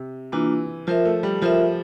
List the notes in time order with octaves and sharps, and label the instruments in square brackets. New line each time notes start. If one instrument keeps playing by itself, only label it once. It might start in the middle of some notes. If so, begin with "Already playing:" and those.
Already playing: [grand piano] C3
[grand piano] E3 [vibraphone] A#3 D4 F4
[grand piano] F3 [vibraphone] F4 A#4 E5
[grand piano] A3
G3
[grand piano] F3 [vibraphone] F4 A#4 E5